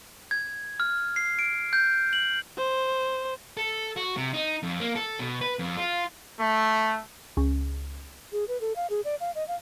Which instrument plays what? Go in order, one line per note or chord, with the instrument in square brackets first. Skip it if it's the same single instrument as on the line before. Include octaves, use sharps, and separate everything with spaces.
[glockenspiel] G#6
F6
C7
D7
G6
F#7
[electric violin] C5
[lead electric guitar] A4
F#4
C3
D#4
F2
A#3
A4
B2
B4
F2
F4
[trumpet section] A3
[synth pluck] C#2
[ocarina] G#4
B4
A4
F5
G#4
D5
F5
D#5
F5